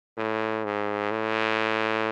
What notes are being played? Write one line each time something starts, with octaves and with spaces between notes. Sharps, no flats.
A2
G#2
A2